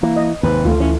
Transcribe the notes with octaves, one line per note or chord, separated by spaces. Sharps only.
E3 A#3
D#5
D#2 G#2 C3 B4
D2 A3 F4
E3 C#4